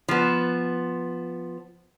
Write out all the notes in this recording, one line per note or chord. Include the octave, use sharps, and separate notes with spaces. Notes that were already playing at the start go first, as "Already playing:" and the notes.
F3 B3